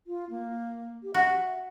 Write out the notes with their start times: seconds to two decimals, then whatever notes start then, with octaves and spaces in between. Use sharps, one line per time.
0.07 F4
0.30 A#3
1.03 G4
1.14 F#4 E5